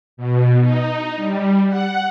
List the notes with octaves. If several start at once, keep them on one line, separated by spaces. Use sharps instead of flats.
B2
D#4
G3
F#5